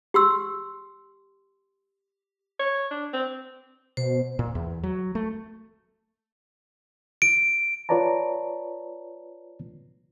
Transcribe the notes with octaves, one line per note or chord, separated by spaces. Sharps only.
G4 C6 E6
C#5
D4
C4
B2 C5
A#2
E2
F#3
A3
D7
F4 B4 C#5 D5 A5 A#5